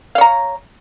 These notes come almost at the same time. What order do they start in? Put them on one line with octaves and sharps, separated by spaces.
F5 C#5 A#5